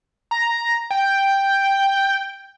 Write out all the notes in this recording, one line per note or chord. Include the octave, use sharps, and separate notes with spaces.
A#5
G5